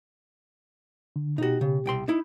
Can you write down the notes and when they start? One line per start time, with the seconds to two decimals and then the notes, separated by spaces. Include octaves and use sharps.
1.16 D3
1.38 B2 D#4 F#4 G4
1.61 C#3
1.86 C2 G5 C6
2.08 D#4 E4